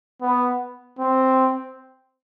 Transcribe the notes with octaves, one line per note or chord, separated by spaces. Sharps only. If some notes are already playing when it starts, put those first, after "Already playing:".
B3
C4